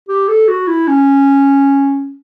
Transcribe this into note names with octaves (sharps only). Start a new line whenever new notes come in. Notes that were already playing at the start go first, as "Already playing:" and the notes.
G4
A4
F#4
E4
C#4